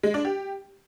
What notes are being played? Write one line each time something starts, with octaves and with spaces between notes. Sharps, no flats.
G#3
D4
G4